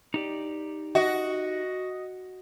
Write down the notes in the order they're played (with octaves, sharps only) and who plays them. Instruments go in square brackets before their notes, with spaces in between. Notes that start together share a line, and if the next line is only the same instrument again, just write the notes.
[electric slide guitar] D#4 G4 D5
[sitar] F#4 [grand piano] D#5